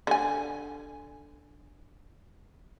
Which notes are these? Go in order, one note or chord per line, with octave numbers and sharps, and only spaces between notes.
D3 G#5